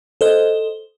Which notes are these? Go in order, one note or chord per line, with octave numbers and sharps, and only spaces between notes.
A4 C5 D#5